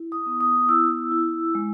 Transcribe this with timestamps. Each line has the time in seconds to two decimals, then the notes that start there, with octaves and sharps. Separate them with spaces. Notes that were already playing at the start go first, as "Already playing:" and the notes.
Already playing: E4
0.12 D#6
0.26 B3
0.40 D#6
0.69 E4 E6
1.12 E4
1.55 G#3